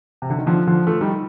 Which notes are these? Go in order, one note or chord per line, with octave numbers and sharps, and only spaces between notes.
C3
D3
D#3
D3 F3
D3 F3
F3 A3
D#3 G3